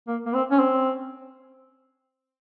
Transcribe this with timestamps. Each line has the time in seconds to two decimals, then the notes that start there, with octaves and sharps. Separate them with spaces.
0.08 A#3
0.26 A#3
0.34 C4
0.51 C#4
0.60 C4